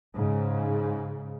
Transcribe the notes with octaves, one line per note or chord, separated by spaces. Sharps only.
G#2 C#3